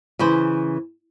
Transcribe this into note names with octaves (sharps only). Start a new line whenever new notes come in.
C#3 E3 B4 C5